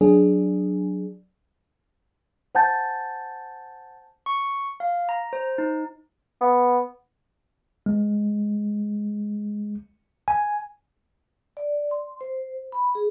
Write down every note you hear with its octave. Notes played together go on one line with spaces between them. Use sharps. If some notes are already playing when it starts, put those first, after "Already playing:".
F#3 D4 G#4
C5 F#5 G#5 A5 G6 A6
C#6
F5
A#5
C5
D#4
B3
G#3
G#5
D5
C6
C5
B5
G#4